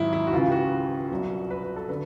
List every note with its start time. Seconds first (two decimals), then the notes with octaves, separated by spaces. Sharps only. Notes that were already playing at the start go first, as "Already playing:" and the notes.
Already playing: G#2 D#3 F#3 E4
0.13 E4
0.27 F#4
0.32 C#2 C#3 E3 F4
0.48 G4
0.52 F#4
1.11 C2 B2 F#3
1.50 B4
1.63 B4
1.76 A4
1.89 D3 B4